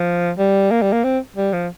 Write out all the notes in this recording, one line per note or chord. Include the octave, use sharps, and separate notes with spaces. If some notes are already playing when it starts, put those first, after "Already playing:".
Already playing: F3
G3
A#3
G3
A#3
C4
G3
F3